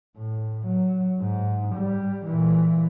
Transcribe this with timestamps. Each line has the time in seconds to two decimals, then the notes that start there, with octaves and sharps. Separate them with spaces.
0.18 A2
0.67 F#3
1.20 G#2
1.75 G3
2.26 A#2 E3